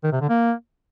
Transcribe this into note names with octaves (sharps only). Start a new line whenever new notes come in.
D#3
C3
D3
A#3